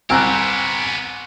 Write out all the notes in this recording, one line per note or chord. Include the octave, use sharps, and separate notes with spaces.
C2 B3 C4 G4 G#5 A#5 F#6